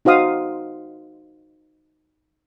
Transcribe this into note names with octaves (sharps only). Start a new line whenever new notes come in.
D#4 F#4 C5 F5 D#6